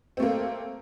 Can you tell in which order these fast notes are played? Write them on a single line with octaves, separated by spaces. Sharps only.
C4 A3 A#3